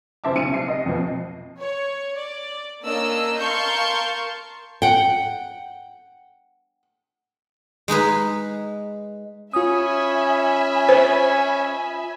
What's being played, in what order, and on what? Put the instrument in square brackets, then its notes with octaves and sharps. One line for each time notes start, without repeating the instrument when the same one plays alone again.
[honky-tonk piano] F#2 C#3 C5 E5 A5 D6
B1 C#3 C#7 D#7
C2 C7
D#5
F2 B2 F3
[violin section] C#5
D5
A#3 C#4 D4 D#5 E6
A#4 F5 A5 C6 C#6 G6
[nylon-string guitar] F#5 G5
[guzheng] G#3 D#4 G#4 B4
[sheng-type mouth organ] C#4 [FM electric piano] F4 D#6 [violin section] E5 G#5 B5
[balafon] C5